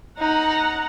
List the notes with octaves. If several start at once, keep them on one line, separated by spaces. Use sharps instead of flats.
D#4 F#5 A#5